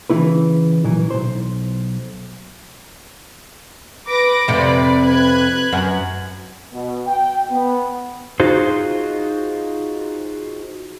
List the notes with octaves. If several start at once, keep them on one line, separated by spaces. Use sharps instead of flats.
C#3 E3 F#3 A3 E4 B4
A#2 E3 F#3
B1 C5
B4 D6 A#6
F2 C3 B4 D5
B4 F#6 G#6
F#2
B2
G5
B3
D#4 F4 F#4 G#4 C5